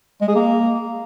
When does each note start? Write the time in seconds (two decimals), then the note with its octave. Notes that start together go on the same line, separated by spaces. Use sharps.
0.21 G#3
0.28 G#4
0.35 A#3